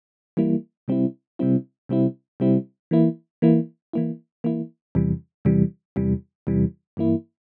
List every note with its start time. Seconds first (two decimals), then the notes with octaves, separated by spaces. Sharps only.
0.37 E3 G3 A#3 E4
0.88 C3 G3 C4 E4
1.39 C3 G3 C4 E4
1.89 C3 G3 C4 E4
2.40 C3 G3 C4 E4
2.91 E3 A#3 E4
3.42 E3 A#3 E4
3.93 E3 A#3 E4
4.44 E3 A#3 E4
4.95 E2 C3 E3 G3
5.45 E2 C3 E3 G3
5.96 E2 C3 E3 G3
6.47 E2 C3 E3 G3
6.97 G2 E3 A#3 E4